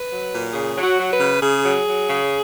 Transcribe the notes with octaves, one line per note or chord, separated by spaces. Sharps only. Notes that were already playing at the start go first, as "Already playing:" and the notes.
Already playing: B4
F#3
A#2
C#3 G#4
F#3
F#4
F#3
B4
C#3
C#3 G#4
F#3
F#3
C#3